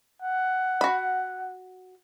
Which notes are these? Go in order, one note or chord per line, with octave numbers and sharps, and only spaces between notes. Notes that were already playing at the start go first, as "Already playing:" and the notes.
F#5
F#4 B5